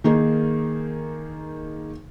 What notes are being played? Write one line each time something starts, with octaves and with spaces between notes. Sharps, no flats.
D#3 A#3 D#4 G#4